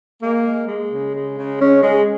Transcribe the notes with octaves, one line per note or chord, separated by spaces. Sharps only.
G#3 A#3
G#3
G#3
C#3
G#3
C#3
G#3 C#4
G#3